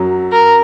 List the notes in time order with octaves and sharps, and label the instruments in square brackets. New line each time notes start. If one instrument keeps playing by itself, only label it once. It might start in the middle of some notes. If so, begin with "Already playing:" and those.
Already playing: [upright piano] F#2 F#3
[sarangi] A#4